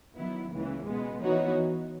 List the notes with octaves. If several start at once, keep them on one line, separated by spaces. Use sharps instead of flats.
D#3 F#3 B3 E4
C#2 C#3 E3 A#3
B2 G#3 B3
E3 B3 D#4 F#4 C#5